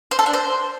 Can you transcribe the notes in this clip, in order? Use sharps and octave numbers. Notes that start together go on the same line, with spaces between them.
C5
A4
D4
C5